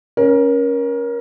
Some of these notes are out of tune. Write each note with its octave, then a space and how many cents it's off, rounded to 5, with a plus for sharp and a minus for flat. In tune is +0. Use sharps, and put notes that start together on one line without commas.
C#4 +0 A#4 +25